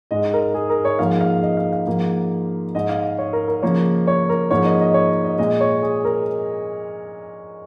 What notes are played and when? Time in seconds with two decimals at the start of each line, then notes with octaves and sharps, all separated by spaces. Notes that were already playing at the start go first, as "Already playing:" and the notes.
0.11 G#2 G#3 D#5
0.34 A#4
0.54 G#4
0.70 A#4
0.85 C#5
0.99 G#2 F3 A#3 F5
1.21 F5
1.43 D#5
1.57 F5
1.73 F5
1.87 G#2 F3 A#3
2.75 G#2 G#3 D#5
2.89 F5
3.19 C#5
3.33 A#4
3.48 A#4
3.62 C#3 F3 A#3 C#5
4.07 C#5
4.29 A#4
4.51 G#2 F3 A#3 C#5
4.66 D#5
4.80 D#5
4.94 C#5
5.24 D#5
5.38 A#2 G#3 D#5
5.61 C#5
5.82 G#4
6.05 A#4